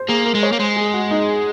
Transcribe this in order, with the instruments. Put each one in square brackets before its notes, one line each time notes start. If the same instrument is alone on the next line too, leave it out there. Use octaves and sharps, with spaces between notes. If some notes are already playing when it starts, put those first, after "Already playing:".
Already playing: [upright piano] C5
[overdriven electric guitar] A#3 [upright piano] G#4
[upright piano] A#4
[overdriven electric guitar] G#3
[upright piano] C#5
[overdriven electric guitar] A#3
[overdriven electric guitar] G#3 [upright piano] C5
[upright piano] G#4
F#4
D#4